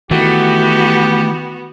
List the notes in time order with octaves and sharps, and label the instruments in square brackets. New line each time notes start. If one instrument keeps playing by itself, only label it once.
[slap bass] D#3 E3 [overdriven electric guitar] A3 [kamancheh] B3 F#4 [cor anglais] G4